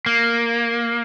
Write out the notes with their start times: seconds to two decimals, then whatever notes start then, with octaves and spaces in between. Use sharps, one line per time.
0.06 A#3